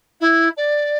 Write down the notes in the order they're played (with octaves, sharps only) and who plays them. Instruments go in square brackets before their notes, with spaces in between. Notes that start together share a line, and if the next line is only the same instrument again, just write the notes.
[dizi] E4
D5